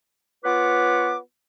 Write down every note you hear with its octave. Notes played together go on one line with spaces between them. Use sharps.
B3 F4 B4 C#5 D6